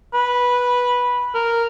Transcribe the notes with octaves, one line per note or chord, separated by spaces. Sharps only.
B4
A#4